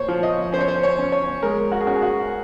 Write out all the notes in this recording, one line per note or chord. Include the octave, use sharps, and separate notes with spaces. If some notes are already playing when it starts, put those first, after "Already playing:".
Already playing: A#2 C5 C#5
F3
D#5
C#4 C5
C#5
C5
C#5
C#4
C#5
G#3 A#4
F#4
G#4
C#4 F#4
G#4
F#4